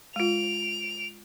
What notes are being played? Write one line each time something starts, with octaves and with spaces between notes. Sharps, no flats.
G#3 F4 D7 F7